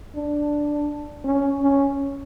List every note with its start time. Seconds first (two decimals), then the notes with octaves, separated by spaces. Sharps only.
0.15 D4
1.24 C#4
1.62 C#4